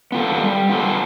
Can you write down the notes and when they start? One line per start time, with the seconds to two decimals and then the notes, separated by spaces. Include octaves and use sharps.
0.12 B3 F4 A4
0.41 G3
0.69 B3 F4 A4